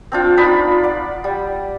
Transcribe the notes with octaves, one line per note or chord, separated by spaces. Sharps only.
C4 D4 F4
D#4 F4 D5 B5
D5 F#5
G3